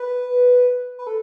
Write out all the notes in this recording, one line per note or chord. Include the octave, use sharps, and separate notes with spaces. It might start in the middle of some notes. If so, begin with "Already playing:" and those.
Already playing: B4
B4
A4